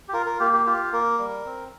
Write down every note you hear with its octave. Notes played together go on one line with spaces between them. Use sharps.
G4
F4 A#4
A#4
A#3 G4
G4
F4 G4
A#3 A#4
G3
C4